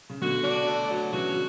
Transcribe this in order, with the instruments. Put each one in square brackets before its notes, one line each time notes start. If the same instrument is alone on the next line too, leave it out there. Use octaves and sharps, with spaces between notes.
[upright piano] C#3
[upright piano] B2 D3 [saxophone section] F#4
[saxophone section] D4
A3
F#3
[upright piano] C#3 E3 [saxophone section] F#4